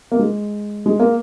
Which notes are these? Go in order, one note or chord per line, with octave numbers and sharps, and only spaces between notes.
A#3
G#3
G#3
A#3